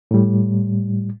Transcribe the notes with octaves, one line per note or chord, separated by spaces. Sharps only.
A2 G3